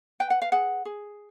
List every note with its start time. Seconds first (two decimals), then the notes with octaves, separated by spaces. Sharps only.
0.20 B4 G5
0.30 F#5
0.42 F5
0.52 G#4 F#5
0.85 G#4